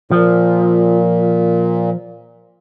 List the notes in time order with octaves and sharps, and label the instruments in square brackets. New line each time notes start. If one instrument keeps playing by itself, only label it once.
[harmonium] A#2 [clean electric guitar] F3